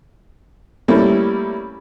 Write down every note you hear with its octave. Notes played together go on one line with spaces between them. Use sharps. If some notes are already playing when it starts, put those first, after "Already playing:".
G3 A3 A#3 C4 C#4 E4